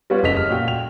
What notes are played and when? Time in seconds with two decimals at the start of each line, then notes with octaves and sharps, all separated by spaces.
0.10 G3 B3 F4 G4 B4 C#5
0.23 F#1 A4 D#5 B6 F7
0.37 F6
0.49 A#2 F#4 F5 G5
0.68 F7